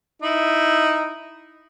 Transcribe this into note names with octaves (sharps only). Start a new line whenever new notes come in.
D#4 E4